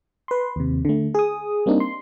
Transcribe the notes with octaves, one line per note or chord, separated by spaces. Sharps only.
B4 C6
D#2 C3
D3 A3
G#4 D#6
G3 A#3 C4 D4 D#4
C6